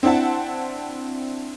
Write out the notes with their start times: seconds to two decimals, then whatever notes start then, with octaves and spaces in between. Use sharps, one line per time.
0.03 C4 D4 E4 F#5 A5